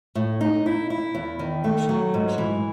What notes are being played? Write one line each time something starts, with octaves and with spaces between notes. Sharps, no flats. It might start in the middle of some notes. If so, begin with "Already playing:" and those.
A2
D#4
E4
E4
E2
D#3
A3
F#3
G#2
E3